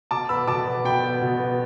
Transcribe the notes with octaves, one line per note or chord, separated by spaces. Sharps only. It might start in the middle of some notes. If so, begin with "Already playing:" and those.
B2 A5 D6
B3 B5 E6
B2 A5 D6
B3
B2 G5 B5
B3
B2
B3